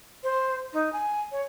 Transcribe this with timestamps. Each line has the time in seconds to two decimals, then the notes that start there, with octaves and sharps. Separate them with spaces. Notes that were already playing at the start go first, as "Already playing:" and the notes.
0.24 C5
0.73 D#4
0.93 G#5
1.32 C#5